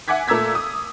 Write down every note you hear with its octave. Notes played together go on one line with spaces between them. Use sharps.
E5 F#5 G#5 D6 G#6 B6
A#2 A3 A#5 E6 G#6 B6
D#6